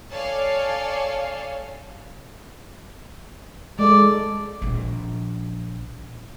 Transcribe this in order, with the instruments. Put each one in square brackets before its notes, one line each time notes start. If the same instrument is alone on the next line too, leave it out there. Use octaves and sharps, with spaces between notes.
[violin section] A4 C#5 D5 F5 G#5 A5
[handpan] G#3 A4 [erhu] D5
[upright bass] A#1 F3